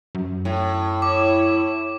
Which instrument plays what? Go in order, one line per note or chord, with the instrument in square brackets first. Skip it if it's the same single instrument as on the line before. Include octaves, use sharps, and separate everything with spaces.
[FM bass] F#2
[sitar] A2
[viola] E4 C#5 [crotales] D6